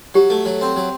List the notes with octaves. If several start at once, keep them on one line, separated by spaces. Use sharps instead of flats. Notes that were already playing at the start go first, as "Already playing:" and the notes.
F#3 G4
A3
F#3
C4
F#3